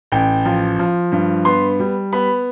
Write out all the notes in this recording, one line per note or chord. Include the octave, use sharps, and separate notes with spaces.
A1 G5
F3
F3
G2
B3 C6
G3
B3 B5